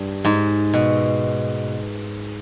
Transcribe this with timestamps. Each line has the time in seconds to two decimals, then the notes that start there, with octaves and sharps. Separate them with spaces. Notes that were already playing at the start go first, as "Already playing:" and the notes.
Already playing: G2
0.24 G#2
0.73 B2